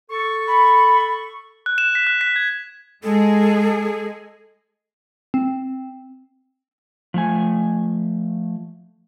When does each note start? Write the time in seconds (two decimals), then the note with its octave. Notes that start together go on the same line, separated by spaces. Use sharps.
0.10 A4 C#6
0.47 B5
1.66 F#6
1.78 E7
1.95 B6
2.07 F#6
2.21 B6
2.36 G#6
3.03 G#3 G#4 A4
5.34 C4
7.14 F3 A3 G#5